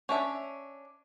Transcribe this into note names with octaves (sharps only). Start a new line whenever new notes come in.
C#4 D4 E5